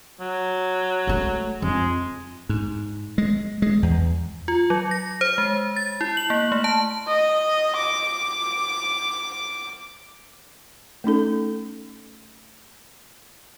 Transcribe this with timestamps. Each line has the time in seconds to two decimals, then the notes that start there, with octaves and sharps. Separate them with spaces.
0.20 F#3
1.07 G#3 A3
1.62 F2 G#3
2.49 G#2
3.18 G#3
3.62 G#3
3.83 E2
4.48 F4
4.70 F#3
4.91 A#6
5.21 C5
5.38 G#3
5.76 A6
6.01 E4
6.17 F#7
6.30 A#3
6.52 A3
6.64 A5
7.07 D#5
7.77 D6
11.04 A3 C#4 D#4 A4